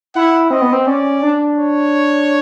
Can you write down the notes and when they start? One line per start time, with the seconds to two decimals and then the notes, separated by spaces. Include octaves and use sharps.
0.15 E4 F#5
0.50 C4 D#5
0.62 B3
0.72 C4
0.87 C#4 D5
1.22 D4
1.58 C#5